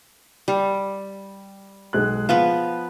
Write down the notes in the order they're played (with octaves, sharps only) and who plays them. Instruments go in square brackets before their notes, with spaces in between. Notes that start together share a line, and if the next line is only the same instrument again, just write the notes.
[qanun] G3
[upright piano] B1 G#3 F#6
[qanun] F3 B3 B4 [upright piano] F5